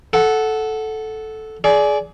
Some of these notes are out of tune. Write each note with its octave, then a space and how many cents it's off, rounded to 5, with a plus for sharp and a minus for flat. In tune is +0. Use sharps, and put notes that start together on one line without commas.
A4 -10 F#5 +0
G#4 +25 D5 -10